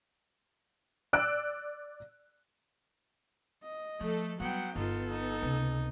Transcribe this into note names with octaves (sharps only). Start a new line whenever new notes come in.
D5 E6 F#6 D7
D#5
F3 A3 A4
F#3 G3 B3 F#5 G5
G1 B3 D#4 F4 A4
D#4
C#2 C3